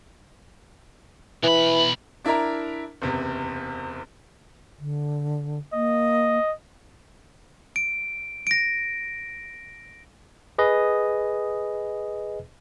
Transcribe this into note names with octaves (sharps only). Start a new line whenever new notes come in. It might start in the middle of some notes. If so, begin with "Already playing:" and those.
B1 E3 B5
D4 E4 A#4 E5 A#5
F#1 E2 C3
D3
A#3 D#5
D7
A#6 D7
G#4 B4 D#5